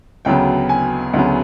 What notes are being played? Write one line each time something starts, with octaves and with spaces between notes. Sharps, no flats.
D2 C#3 F#3 B3 G5
G#5
D2 C#3 F#3 B3